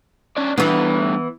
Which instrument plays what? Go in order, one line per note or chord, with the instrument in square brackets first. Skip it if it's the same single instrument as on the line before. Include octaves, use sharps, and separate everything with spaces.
[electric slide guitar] C#4 D4 D5
[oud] E3 B3 [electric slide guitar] G3 A3 D4